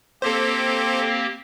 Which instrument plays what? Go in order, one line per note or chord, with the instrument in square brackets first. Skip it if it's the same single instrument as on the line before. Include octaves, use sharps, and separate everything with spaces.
[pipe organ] A#3 C4 G4 [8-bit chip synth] A4 C5